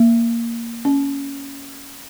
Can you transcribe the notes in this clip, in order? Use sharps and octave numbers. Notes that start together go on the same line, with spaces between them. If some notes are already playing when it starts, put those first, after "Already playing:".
Already playing: A#3
C#4